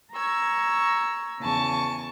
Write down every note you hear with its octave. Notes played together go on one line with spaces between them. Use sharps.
A#5 C#6 E6 G#6
E2 C#3 G#5 A5 C#6